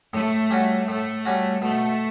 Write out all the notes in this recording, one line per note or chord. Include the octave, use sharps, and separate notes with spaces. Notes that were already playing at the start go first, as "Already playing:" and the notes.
A2 A3
G3 C#4 F#4
A2 A3
G3 C#4 F#4
B2 A3